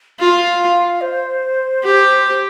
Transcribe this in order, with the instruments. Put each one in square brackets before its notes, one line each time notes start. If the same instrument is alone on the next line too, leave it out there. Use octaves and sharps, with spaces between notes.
[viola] F4 [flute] F5
[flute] C5
[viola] G4